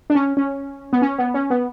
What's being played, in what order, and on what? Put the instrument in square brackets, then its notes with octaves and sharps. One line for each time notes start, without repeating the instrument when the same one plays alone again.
[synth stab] D4
C#4
C#4
B3
C#4
B3
C#4
B3